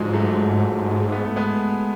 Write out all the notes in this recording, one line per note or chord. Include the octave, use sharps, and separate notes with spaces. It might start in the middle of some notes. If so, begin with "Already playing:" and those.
Already playing: G#2 D3 F3 F#3 G#3
F#3 A3
B3
A3
G#3 B3